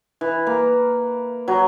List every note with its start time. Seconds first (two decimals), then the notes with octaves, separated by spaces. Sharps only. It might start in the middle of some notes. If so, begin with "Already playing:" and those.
0.21 E3
0.47 A#3
1.48 F#3